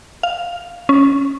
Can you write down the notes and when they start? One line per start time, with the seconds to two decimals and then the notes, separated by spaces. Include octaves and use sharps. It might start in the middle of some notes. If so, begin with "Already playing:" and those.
0.23 F5
0.89 C#4